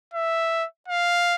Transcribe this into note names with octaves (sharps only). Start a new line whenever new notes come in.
E5
F5